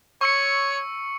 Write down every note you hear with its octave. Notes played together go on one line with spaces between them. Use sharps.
C#5 C#6 E6 C#7